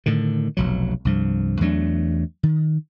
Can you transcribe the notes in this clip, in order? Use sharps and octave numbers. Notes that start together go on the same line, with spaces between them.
A2 D3 D#3
F1 B1 F#3
C2 G2 F3
E2 F#3 A3 D4
D#3